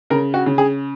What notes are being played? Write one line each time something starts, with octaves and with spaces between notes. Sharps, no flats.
C#3 A#4
F#4
C#3
G#4